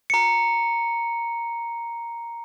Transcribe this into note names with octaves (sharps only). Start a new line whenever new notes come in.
A#5 C#7